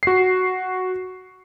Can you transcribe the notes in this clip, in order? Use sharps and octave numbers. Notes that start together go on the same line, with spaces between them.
F#4 C7